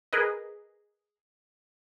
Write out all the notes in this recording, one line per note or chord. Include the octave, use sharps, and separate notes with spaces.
G#4 A#4 B4 D#5